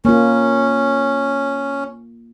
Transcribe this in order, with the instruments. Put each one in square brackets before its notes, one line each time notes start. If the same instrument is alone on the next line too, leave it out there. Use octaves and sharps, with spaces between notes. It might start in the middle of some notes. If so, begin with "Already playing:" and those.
[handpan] A#3 F4 [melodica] C#4